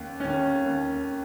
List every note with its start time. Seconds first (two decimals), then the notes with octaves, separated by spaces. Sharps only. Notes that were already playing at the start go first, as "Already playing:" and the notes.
Already playing: D#2 C#4
0.20 D#3 C#4
0.66 D#2